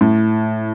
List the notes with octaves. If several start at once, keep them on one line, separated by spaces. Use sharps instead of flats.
A2